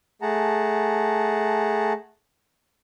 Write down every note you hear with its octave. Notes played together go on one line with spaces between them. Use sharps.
A3 G#4 F#5 A5 A#5